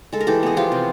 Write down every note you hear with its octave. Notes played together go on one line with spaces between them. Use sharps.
G#3 A4
A#4
E3 G4 A4
B3 G#4
F3 F4 G4
C3